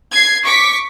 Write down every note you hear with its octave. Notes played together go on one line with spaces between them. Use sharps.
G#6 C7
C#6 D6 B6